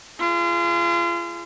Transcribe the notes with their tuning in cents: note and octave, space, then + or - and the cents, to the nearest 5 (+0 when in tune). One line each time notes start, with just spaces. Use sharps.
F4 -35 G#4 +15